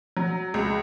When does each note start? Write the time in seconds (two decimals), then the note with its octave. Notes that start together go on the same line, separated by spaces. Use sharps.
0.17 F#3
0.54 C#2